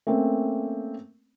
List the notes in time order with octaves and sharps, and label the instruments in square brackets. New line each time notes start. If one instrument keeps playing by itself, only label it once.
[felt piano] A3 A#3 C4 C#4